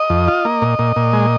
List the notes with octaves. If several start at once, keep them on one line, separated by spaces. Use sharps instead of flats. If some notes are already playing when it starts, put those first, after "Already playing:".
Already playing: D#5
F2
F4
A#3
A#2
A#2
A#2
G#3